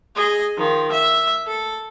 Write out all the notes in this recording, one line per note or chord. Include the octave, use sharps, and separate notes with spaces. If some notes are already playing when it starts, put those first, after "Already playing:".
G#4 D#5
D#3 F3
E5
A4